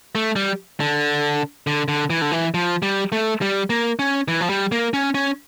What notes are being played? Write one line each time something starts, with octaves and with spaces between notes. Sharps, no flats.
A3
G3
D3
D3
D3
E3
D3
E3
F3
G3
A3
G3
A#3
C#4
E3
F3
G3
A#3
C#4
C#4